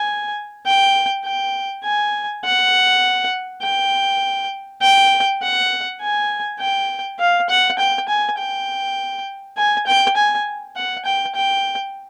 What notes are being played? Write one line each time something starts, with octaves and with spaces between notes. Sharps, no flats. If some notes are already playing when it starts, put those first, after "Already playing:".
Already playing: G#5
G5
G5
G#5
F#5
G5
G5
F#5
G#5
G5
F5
F#5
G5
G#5
G5
G#5
G5
G#5
F#5
G5
G5